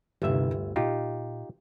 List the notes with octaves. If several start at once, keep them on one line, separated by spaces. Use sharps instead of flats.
G1 D#2 C3 E5
D2 A#3
A#2 D#4 F4 G4